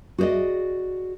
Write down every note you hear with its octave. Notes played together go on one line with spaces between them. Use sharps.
F#4 G#4 C5 D5 D#5